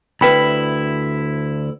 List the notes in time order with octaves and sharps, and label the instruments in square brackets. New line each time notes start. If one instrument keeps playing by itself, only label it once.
[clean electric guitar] D2 E4 [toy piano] B4 G5 B5